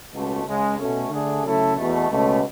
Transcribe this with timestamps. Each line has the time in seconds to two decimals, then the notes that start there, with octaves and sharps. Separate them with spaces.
0.12 C#2 B2 A3
0.45 C#2 C#3 G#3
0.77 B2 A3 C#4
1.10 D3 A3 D4 G#4
1.43 C#3 F#3 A3 E4 A4
1.76 E2 B2 A3
2.08 C#2 B2 A3 C#4